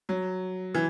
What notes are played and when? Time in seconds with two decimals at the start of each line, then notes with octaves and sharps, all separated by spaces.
0.09 F#3
0.74 E3